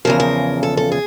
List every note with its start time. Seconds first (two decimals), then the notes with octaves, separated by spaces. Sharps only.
0.05 E2 C#3 F3 A#4
0.20 A#4
0.63 A4
0.77 A4
0.92 G#4